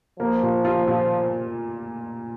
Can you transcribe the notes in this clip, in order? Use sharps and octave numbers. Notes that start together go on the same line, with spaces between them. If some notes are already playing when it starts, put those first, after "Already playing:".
F3 A#3
A#2
F4
A#2